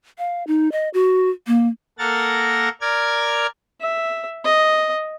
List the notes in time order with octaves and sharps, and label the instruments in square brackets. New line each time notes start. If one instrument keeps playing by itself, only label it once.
[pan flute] F5
D#4
D#5
F#4
A#3
[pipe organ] A#3 A4 A#4 F#5 A#5 A6
A#4 D5 F6 G#6
[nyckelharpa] E5
D#5